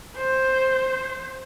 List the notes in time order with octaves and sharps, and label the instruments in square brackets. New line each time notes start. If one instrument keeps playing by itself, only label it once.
[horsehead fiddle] C5